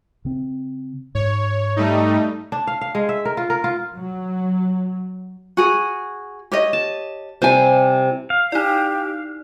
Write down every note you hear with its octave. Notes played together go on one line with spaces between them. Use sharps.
C#3 C4
G#2 C#5
G3 A3 D#4
D4
F5
F5
G#3
E5
A#4
F4
A#4
F4
F#3
F#4 G#4
G4 C#5 D#5
A5
C3 G3 E4 C5 G#5
F5
D#4 E4 G4 D5